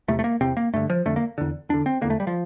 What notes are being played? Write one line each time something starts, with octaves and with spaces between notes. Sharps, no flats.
E2 C3 A3
A3
A#3
E2 C3 C4
A#3
G2 D3 A3
F3
F2 D3 A3
A#3
E2 D3
E2 D3 D4
C4
E2 D3 A#3
A3
G3
F3